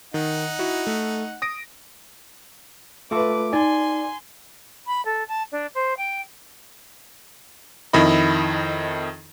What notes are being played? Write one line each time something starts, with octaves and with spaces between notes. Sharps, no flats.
D#3 D#4 F#5
E4 F#4
A3
D#6 A#6 D7
A3 F4 A4 B4 E5 D6
D#4 D5 G#5 C6
B5
A4
A5
D4
C5
G5
F2 D#3 E4 D#5 B5